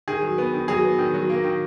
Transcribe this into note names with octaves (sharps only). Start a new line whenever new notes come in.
D#3 G#4
F#3
B3
D#3
F#3 G#4
B3
D#3
F#3
A#3
D#3